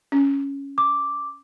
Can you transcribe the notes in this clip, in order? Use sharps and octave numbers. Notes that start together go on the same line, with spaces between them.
C#4
D6